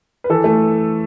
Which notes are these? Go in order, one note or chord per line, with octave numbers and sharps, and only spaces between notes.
B4
E3 A4
A3